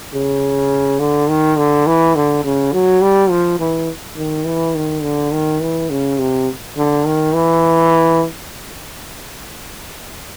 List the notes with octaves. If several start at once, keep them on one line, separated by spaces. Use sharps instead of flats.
C#3
D3
D#3
D3
E3
D3
C#3
F#3
G3
F3
E3
D#3
E3
D#3
D3
D#3
E3
C#3
C3
D3
D#3
E3